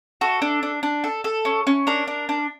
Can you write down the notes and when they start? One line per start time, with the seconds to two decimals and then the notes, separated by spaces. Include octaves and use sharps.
0.21 F#4 A4
0.42 D4
0.63 D4
0.83 D4
1.04 A4
1.24 A4
1.45 C#4
1.67 C#4
1.87 D4 A#4
2.08 D4
2.29 D4